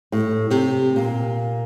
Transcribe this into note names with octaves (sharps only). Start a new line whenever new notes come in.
A2
C3
A#2